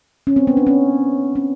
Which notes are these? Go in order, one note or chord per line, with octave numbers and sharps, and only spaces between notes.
C#4
C4
B3
D4
C#4
C#4